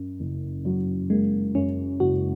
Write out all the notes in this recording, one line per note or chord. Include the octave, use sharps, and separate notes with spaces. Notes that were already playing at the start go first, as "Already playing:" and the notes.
Already playing: F#2
F#1
F#3
G#3 A#3
F#2 C#4
F#1 F#4